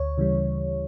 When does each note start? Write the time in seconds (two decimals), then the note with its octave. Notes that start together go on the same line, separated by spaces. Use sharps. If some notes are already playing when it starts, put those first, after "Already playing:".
Already playing: D2 C#5
0.18 C#3 E3 G3